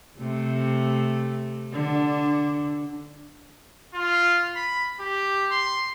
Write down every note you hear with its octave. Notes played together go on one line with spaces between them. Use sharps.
C3 A3
D3 D4
F4
B5
G4
C6